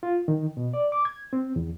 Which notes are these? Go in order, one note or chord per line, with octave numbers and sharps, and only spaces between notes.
F4
D#3
B2
D5
D6
G#6
C4
E2